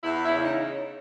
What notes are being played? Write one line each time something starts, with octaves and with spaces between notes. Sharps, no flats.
E2 E4
E4
C#3
D#4